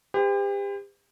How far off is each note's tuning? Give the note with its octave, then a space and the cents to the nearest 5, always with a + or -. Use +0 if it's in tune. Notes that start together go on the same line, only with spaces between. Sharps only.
G4 +35 C5 -45